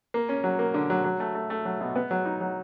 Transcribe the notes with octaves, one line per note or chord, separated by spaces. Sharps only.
A#3
C#4
F#3
A#3
D3
F#3
F#3
A3
A3
A3
F#3
B2
B3
F#3
D#4
F#3